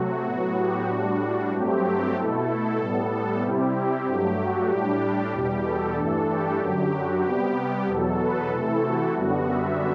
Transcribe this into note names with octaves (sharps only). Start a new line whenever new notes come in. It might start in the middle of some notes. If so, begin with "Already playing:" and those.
Already playing: C3 F#3 A3 F#4
A2 F#3 B3 F#4
G4
A2 G3 D4 F#4
G2 F#3 A3 C4 G4
B2 A3 E4 A4
A2 G3 B3
A4
C3 G3 C4 E4 G4
G4
G2 F#3 A3
F#4
A2 G3 D4 G4
E2 B2 G3 G4
A4
G2 E3 A3 D4 A4
G4
F#2 D3 F#3
F#4
C3 G3 B3 G4
E2 B2 F#3 A4
B4
C3 E3 A3 E4 A4
F#4
F#2 D3 G3 B3
E5